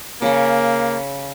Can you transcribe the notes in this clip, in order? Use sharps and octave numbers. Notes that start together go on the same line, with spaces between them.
C#3 A#3 C#4